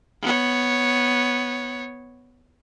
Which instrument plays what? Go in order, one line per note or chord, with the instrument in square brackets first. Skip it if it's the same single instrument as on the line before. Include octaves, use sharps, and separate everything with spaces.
[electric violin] B3 C#5